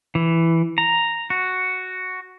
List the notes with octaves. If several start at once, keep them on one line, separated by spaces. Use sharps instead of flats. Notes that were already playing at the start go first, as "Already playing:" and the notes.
E3
A#5
F#4